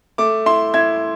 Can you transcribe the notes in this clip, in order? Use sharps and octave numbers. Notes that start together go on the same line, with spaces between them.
A3 D6
E4 C6
E4 G#6